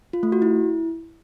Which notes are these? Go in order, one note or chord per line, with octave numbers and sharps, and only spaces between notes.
F4
A3
F#4
E4